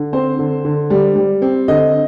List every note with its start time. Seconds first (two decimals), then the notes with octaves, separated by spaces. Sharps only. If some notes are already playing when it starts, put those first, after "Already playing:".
Already playing: D3
0.13 C4 C5
0.39 D3
0.65 D3
0.90 G3
1.16 G3
1.42 C4
1.68 D3 D#5